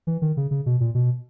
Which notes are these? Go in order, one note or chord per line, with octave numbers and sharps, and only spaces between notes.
E3
D#3
C#3
C#3
B2
A#2
B2